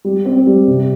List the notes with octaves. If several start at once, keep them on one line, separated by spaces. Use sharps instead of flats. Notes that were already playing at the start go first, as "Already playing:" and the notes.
G3
C4
G3
C3